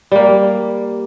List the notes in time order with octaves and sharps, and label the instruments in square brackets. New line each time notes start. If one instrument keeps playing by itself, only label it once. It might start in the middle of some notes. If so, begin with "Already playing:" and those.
[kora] G3 A#3